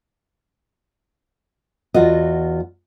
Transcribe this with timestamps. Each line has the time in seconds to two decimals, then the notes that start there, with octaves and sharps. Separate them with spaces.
1.94 E2 F4 F#4 D#5